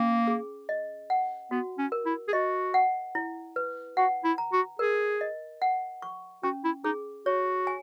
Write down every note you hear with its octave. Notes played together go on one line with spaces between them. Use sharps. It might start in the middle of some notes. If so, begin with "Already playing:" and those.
Already playing: A#3 C#4
G#4
D#5
F#5
B3 F#4
C#4
A#4
E4
G#4
F#4 D#5
F#5
E4
B4
F#4 F#5
E4
A#5
F#4
G#4 A#4
D#5
F#5
C#6
C#4 F#4
E4
D#4 G#4
F#4 C#5
G#5